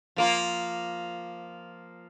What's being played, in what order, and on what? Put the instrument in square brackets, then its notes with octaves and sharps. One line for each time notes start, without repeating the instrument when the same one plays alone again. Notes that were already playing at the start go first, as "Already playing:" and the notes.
[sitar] F3 A#3 F4